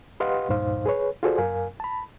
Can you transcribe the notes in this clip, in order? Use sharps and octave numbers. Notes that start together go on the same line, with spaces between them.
G4 B4 D#5 F5 F#5 C6
C#2 G2 A#2 D#4 C5 F5
G#4 B4 C#5
F4 F#4 G#4 A4 C5 D5
F#2 A#4 F5 G#5
A5 B5